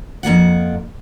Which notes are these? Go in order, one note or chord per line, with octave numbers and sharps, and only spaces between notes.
F2 A#3 F4 F#5